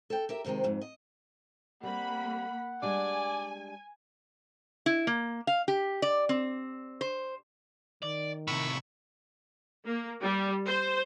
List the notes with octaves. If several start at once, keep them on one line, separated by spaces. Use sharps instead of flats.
A4 G5
G4 A#4 E5
F2 C3 D#3 G#3 C4
F2 G#2
D#5
G3 A#3 C4 F#5 B5
G3 G#3 D4 D5 G#5
E4
A#3
F5
G4
D5
C4
C5
D#3 D5
A2 C3 B5 C#6 E6
A#3
G3
C5